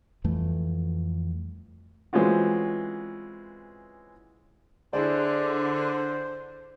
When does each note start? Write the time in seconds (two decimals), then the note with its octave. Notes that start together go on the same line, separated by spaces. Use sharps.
0.24 F2 E3 G3 A3
2.13 E3 G#3 C4 C#4 F4 F#4
4.93 D3 E4 G#4 C5 D5